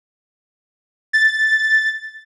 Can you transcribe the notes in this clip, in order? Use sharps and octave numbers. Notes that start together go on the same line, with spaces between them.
A6